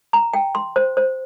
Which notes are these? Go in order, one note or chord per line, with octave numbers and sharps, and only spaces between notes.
A#5
G5
C6
C5
C5